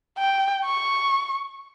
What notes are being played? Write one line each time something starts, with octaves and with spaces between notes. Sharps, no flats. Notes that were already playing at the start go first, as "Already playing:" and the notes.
G5
C#6